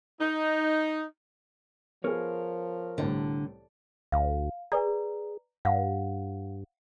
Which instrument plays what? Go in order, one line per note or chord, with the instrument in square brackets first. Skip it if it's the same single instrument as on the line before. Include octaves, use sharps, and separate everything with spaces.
[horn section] D#4
[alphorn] F3 [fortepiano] B3 G#4 [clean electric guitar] A#4 C#5
[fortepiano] C2 A2 C5 [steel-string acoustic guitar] D3
[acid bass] D2 [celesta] F5
[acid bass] G#4 [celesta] B4 D5 A#5
[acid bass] G2 [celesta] F5 F#5